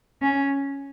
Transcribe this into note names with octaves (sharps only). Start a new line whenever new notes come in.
C#4